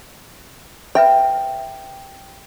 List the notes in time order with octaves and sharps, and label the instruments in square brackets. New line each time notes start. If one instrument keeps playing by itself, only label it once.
[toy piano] B4 E5 B5 [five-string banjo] G5